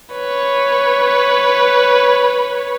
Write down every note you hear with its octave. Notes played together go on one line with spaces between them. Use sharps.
B4 C#5